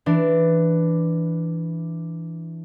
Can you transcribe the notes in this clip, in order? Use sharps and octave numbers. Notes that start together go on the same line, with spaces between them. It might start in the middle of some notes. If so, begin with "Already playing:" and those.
E3 D4